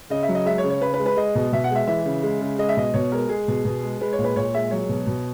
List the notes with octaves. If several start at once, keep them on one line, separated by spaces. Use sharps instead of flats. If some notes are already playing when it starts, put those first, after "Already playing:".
C#3 D#5
E5
F#3
D#5
G#3 E5
C#5
C#3
C#5
C#3 B4
B4
G#3
B4
G#3 D#5
B2
B2 E5
F#5
G#3 E5
E3 E5
C#3
G#3
C#3
G#3 D#5
E5
B2 D#5
B2 C#5
G#3 A#4
G#3 G#4
B2
B2
G#3
G#3 B4
C#5
A#2
B4
A#2 C#5
G#3 E5
F#3 C#5
B2
B2